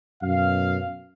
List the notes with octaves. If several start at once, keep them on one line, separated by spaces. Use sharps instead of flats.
F#2 B2 F5